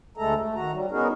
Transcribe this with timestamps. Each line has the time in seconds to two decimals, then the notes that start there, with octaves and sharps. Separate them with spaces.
0.17 D2 G#3 A3 A4 A#5
0.35 A3
0.55 D#3 F#4 A#5
0.72 F#3 G3
0.91 B3 C#4 D#4 F#4 G#4 A#4